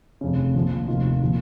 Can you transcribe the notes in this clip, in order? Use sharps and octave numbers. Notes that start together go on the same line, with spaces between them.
F1 F2 C#3
A#1 A#2 F3
F1 D#2 D#3 F4
A#2 F3